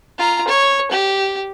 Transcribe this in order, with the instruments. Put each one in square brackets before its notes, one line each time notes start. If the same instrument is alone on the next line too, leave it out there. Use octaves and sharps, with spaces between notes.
[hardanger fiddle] F4 A#5
C#5
G4